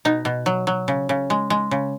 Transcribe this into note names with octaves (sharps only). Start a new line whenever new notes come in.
B2 D#4
B2
F#3
F#3
C#3
C#3
G#3
G#3
C#3